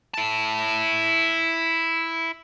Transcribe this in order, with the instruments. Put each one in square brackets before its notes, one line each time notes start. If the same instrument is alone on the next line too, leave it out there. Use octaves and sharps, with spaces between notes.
[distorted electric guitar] E4 A5